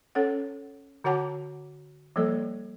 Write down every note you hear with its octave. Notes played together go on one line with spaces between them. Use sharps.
C#4 A4 C#5 F#5
D3 F#4 C#5 F#5 A5 D6
F3 G3 A#3 A4 D5